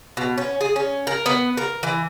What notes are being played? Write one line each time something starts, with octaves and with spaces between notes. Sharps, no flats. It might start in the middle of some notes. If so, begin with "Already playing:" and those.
B2
C#4
G#4
C#4
A#4
B3
A#4
E3